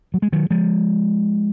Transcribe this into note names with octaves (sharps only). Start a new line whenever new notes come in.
F#3
G#3
D#3 F#3
F3 G#3